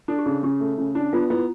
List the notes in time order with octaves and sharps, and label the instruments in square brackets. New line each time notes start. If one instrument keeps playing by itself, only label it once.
[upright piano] D4 [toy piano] A4
[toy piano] G4
[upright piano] C#3 [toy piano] G#4
[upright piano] C#3 [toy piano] G4
[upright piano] A3
C#3
D4
[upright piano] B3 [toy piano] F4
[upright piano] B3 [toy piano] E4